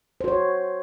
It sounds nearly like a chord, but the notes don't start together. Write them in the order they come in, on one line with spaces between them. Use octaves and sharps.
C5 F#4 C#5